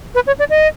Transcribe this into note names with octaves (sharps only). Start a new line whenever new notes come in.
B4
C#5
D5
D#5